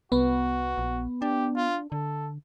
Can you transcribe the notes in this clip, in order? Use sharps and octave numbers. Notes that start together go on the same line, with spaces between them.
C2 B3 F#4
A#1
D4 G4
F4
D3 A4